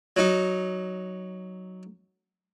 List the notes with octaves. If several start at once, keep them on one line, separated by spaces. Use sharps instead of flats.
F#3 D#4